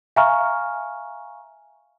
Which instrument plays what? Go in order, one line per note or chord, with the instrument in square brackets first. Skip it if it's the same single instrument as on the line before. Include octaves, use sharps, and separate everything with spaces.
[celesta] E5 F5 G#5 A#5 C#6 F6